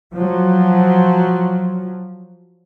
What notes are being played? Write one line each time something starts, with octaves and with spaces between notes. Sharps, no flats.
F3 F#3